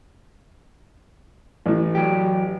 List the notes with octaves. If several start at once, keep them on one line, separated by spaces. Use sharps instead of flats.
A1 A2
F#3 G4